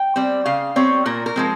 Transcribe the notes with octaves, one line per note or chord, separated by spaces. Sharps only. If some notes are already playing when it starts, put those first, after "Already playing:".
Already playing: G5
G3 C4
C#3 F5
G3 C4 C#5
A#2 A#4
A#4
F3 G#3 C4